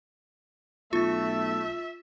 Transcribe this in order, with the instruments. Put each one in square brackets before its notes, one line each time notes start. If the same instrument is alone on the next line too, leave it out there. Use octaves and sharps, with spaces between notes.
[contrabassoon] B1 [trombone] A3 [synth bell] F4 A6 [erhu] E5